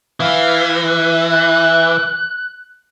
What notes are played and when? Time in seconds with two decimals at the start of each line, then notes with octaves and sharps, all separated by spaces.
0.20 E3 F5
0.86 F#6